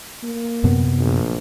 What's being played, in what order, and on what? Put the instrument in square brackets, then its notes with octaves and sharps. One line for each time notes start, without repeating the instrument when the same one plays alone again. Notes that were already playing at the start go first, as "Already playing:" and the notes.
[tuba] A#3
[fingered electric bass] F#2 C3 B3
[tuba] A#1